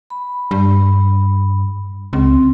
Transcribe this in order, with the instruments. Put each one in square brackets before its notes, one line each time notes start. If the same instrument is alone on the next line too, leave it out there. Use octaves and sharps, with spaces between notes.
[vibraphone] B5
[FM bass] G2
[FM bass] C#2 [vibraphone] C4